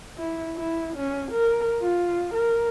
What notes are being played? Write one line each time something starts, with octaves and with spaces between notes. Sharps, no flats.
E4
E4
C#4
A#4
F4
A#4